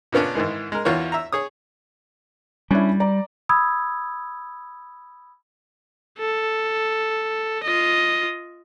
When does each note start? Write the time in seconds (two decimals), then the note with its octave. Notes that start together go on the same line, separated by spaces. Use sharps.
0.12 A#2 C#3 B3 C#4 D4
0.35 G#2 D#3 E3 G#3
0.72 G#3 A#4
0.85 E2 E3 F4 F#4 C#5
1.12 E5 A#5
1.32 G#4 C#5 D#6
2.71 G3 C#4 D4 E4
3.00 D5 A#5
3.49 B5 D#6 E6 G#6
6.19 A4
7.63 F4 D#5